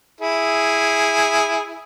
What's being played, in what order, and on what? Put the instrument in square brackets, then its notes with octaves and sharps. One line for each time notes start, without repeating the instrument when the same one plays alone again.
[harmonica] E4 G#4